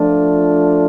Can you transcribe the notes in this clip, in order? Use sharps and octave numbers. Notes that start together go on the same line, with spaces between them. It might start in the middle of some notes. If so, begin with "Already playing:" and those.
Already playing: F3 A3 D4 F4